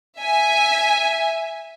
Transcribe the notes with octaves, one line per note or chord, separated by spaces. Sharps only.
E5 G#5